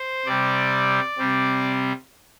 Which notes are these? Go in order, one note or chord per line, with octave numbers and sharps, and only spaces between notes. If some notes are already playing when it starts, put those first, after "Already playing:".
Already playing: C5
C3 G3 C4 D5
C3 G3 C4